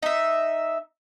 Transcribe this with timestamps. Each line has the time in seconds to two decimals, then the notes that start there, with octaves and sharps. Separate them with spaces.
0.02 D#4 E5